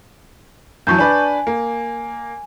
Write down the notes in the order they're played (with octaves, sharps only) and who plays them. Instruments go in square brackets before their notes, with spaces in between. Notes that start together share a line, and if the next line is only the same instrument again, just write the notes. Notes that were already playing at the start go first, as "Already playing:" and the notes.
[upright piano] F#2 E3 F#3 [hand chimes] A5 C#6 G6
[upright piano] D4 B4 D5 [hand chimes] G#5
[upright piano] A#3